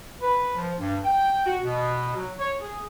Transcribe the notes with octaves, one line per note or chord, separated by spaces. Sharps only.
B4
F3
G2
G5
F#4
B2
F#3
C#5
G#4